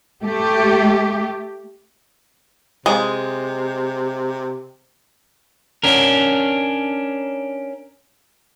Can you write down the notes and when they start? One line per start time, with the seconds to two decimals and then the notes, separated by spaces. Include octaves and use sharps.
0.23 A3 G4
2.86 C3 G#3
5.83 C#4 D4 A#4